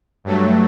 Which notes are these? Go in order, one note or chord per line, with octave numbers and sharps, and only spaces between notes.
G2 F#3 A3